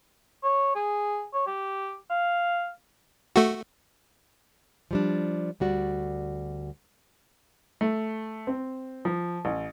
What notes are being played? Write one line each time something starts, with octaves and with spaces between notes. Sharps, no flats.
C#5
G#4
C#5
G4
F5
A3 F#4
F3 G3 D4
D2 G3 F#4 D5
A3
C4
F3
A1